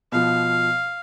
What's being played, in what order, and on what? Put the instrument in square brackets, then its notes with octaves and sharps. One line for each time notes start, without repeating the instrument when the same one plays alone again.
[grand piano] B2 F3 [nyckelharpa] F5